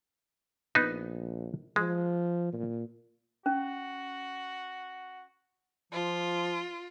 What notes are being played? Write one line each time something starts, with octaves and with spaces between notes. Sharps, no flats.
A#1 B3 D#4
F3 G#3
A#2
C#4 F#4
F3 F4